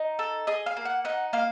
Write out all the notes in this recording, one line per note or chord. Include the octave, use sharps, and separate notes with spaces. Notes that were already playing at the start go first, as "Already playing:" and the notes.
Already playing: D#4
A4
G#4 D#5
F5
A#3
F#5
D#4 F#5
A#3 F5